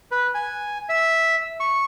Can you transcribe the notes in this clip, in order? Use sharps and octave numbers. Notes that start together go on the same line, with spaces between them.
B4
G#5
E5
C#6